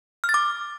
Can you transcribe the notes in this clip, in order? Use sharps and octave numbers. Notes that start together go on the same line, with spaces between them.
F6
A6
D6